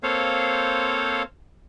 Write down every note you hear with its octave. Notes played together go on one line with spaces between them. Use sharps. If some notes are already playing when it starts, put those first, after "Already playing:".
A#3 C4 A4 C5 C#5 F5